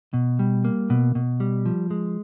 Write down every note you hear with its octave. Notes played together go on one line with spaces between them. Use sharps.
B2
G3
A#3
B2
B2
G3
F3
G#3